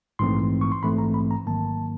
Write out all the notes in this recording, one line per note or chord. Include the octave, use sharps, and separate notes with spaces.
A#1 G#2 E3 A3 C4 C6
C#6
C6
A#1 G#2 E3 A3 C4 B5
A#5
B5
A#5
G#1 G#2 D#3 F#3 A#3 A5